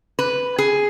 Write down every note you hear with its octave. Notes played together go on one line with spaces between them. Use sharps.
B4
G#4